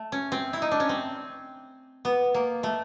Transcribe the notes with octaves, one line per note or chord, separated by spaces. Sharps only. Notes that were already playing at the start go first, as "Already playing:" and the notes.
Already playing: A3
C#4
C4
E4
D#4
D4
C#4
C4
B3
A#3
A3